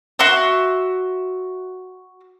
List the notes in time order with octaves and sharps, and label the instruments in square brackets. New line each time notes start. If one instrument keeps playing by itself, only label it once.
[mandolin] F#4 E5 C6 E6